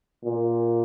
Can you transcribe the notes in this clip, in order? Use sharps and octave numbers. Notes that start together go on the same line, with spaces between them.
A#2